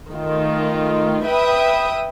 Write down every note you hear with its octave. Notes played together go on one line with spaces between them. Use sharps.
D#3 A3 F4
B4 E5 G5 D#6